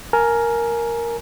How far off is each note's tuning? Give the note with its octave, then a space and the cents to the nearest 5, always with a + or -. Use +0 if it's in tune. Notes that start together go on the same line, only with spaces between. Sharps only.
A#4 +0 G#5 +20